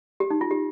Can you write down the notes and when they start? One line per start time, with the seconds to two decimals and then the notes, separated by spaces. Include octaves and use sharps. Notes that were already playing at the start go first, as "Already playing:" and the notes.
0.20 G4
0.30 D#4
0.41 F4
0.51 G4